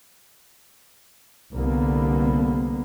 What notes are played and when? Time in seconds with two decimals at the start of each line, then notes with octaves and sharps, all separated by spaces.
1.54 C2 D3 A#3 B3